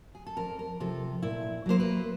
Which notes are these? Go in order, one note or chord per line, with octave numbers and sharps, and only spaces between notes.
G#4
A4
F2 A#4
A#4
C3 F3 A4
A#2 E4
F#3 A#3 C5
B4